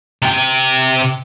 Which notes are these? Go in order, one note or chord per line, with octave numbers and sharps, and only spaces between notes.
C3 G5